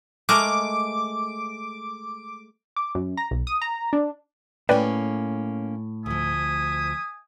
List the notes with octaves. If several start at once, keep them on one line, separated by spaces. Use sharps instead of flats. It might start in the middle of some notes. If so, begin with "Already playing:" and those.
G#3 A3 A#4 D6
D6
F#2
A#5
B1
D#6
A#5
D4
A2 A#3 C#4 B4 D5 G5
D2 F3 E5 G#5 D#6